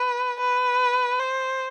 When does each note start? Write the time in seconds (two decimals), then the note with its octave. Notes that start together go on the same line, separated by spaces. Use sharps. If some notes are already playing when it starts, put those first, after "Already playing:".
Already playing: B4
0.40 B4
1.19 C5